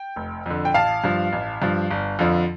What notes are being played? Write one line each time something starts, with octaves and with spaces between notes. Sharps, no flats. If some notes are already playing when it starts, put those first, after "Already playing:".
Already playing: G5
F1
F2 D3
G5
A1 F5 A5
G2 F3
A1
G2 F3
G1
F2 D3 F3